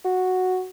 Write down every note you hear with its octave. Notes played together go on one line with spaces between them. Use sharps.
F#4